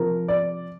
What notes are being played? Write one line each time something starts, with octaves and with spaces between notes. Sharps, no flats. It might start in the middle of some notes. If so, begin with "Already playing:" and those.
Already playing: C3 F3 C4 A#4
D5